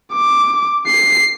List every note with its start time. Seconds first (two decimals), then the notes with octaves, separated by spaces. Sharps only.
0.13 D6
0.87 C7